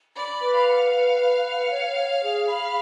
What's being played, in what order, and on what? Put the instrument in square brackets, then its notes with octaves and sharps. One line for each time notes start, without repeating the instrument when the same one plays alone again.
[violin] D5 [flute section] B5
[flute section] B4
[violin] F5
[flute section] F#5
B4
B4
F#5
C#5
C#5
G#4
[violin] F5 [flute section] B5